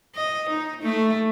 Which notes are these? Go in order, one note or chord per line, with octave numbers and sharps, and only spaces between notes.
D#5
D#4
A3